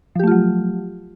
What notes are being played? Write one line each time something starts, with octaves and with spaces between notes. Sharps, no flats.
F3 F#3 A3 F4 G4